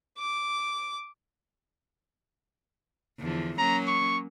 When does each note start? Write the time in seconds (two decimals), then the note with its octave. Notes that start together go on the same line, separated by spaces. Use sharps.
0.19 D6
3.19 E2 D3 F3
3.58 F#3 A#3 C#4 A#5
3.88 C#6